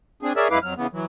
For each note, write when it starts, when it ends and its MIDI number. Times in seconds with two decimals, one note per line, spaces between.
0.23 0.33 60
0.23 0.33 62
0.23 0.33 68
0.36 0.48 68
0.36 0.48 70
0.36 0.48 73
0.36 0.48 74
0.36 0.48 76
0.36 0.48 88
0.51 0.59 42
0.51 0.59 56
0.51 0.59 64
0.51 0.59 71
0.51 0.59 77
0.51 0.59 86
0.63 0.74 41
0.63 0.74 54
0.63 0.74 89
0.77 0.87 49
0.77 0.87 52
0.77 0.87 59
0.93 1.06 52
0.93 1.06 54